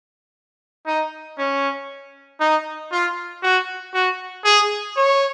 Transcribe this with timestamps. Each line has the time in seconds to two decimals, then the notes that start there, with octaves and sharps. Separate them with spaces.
0.87 D#4
1.38 C#4
2.40 D#4
2.92 F4
3.43 F#4
3.94 F#4
4.44 G#4
4.96 C#5